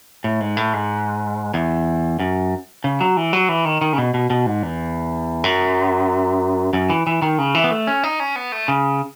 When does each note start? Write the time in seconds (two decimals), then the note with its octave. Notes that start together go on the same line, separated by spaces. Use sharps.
0.24 A2
0.40 G#2
0.57 A2
0.73 G#2
1.54 E2
2.19 F#2
2.84 C#3
3.01 F#3
3.17 E3
3.33 F#3
3.49 E3
3.65 D#3
3.81 D#3
3.93 C#3
3.98 B2
4.14 B2
4.30 B2
4.46 G#2
4.63 E2
5.44 F#2
6.73 F#2
6.90 E3
7.07 E3
7.22 D#3
7.38 C#3
7.55 E3
7.64 B3
7.71 A3
7.87 C#4
8.03 D#4
8.20 C#4
8.36 B3
8.52 A3
8.68 C#3